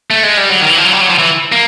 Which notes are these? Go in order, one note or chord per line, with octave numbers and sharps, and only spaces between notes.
A3
G#3
G3
F#3
D#3
E3
F3
F#3
G3
F#3
F3
E3
A#3